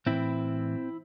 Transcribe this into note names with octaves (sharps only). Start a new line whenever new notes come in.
A2 E3 C4 E4